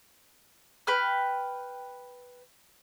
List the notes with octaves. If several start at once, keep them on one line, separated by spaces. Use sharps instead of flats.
B4 G5 F6